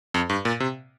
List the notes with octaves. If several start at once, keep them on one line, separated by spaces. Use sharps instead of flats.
F2
G2
A#2
C3